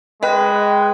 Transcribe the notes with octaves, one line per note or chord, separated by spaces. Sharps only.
G#3 B4 D#5 G5 F#6